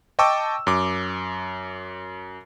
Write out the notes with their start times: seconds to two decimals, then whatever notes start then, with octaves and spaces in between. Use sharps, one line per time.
0.19 D#5 G5 A5 C#6 D6 E6
0.67 F#2 D6